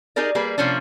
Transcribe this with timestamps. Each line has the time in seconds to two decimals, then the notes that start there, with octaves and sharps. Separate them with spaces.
0.16 D#4 G4 G#4 A#4 D5
0.35 G3 A#3 G#4 B4
0.58 C3 F3 A#3 C#4 D4